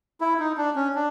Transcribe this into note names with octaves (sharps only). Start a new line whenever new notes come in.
E4
D#4
D4
C#4
D4